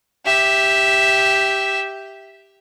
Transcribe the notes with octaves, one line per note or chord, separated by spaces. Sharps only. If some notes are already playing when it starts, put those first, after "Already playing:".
G4 E5